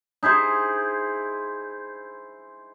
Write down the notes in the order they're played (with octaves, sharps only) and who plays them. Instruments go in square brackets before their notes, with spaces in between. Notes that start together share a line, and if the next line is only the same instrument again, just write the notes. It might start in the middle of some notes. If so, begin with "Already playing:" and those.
[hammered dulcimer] D#4 E4 G#4 C5